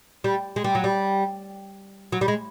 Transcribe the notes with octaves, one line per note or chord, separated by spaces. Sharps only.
G3
G#3
G3
F#3
G3
F#3
G3
G#3